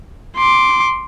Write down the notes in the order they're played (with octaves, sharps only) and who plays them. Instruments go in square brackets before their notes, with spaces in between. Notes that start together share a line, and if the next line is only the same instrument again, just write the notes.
[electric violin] C6 D6